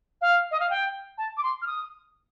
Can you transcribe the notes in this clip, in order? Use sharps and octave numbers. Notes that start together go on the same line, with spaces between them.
F5
D#5
F5
G5
A5
D6
C6
F6
D#6